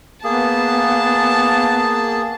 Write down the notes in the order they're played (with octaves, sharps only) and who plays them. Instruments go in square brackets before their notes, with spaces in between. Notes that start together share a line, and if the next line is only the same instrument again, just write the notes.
[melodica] A#3 G#4 [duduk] B3 [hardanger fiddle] A5